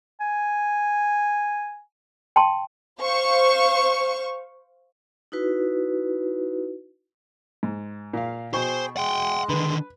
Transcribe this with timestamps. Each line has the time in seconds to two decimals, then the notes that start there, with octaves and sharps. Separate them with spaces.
0.21 G#5
2.36 G5 A5 C6
3.00 C5 F5 C#6
5.32 D#4 E4 F#4 B4
7.63 G#2
8.13 A#2 F5
8.53 B2 G#4 C5 G5 C#6
8.97 G#3 F#5 G5
9.49 D3 D#3 B4